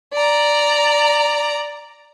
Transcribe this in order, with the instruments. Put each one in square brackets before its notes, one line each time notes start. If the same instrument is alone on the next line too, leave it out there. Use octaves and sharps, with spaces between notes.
[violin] D5 A#5